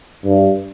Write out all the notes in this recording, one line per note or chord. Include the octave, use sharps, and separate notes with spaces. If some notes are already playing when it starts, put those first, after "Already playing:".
G2